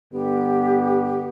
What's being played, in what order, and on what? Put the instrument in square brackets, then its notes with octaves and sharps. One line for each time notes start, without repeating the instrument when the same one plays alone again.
[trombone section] G2 D3 B3 [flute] G4